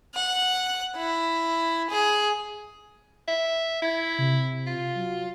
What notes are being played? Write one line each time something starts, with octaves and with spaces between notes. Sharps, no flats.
F#5
E4
G#4
E5
E4 G#6
C3
F4
F#3